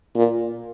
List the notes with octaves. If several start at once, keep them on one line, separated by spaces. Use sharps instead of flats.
A#2